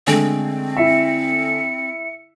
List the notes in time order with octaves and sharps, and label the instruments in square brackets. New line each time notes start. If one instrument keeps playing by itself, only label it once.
[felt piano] D3 G#3 A3 [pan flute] C4
[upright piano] E4 E5 [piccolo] C#7